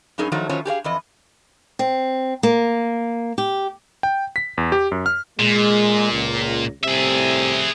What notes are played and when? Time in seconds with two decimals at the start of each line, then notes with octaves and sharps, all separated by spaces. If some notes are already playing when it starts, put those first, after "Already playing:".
0.18 G2 F#3 C#4 D#4 G#4 A#4
0.32 D#3 F3 F#3 A3 D#4
0.49 D#3 F#3 C#4 F4 C5 C#5
0.65 G4 G#4 C#5 F5
0.84 F2 E3 D#5
1.79 C4
2.43 A#3
3.38 G4
4.03 G5
4.36 B6
4.58 E2
4.72 G4
4.92 F#2
5.06 F6
5.39 A#2 G#3
6.12 C#2
6.84 C2 A2 C3 G#4 E5